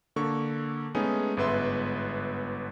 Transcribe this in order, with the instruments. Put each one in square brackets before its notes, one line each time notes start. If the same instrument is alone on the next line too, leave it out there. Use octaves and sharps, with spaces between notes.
[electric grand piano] D3 A#3 A4 C#6
G#3 A3 B3 C#4 D#4 G#4
G1 G#2 B3 B4 E5 C6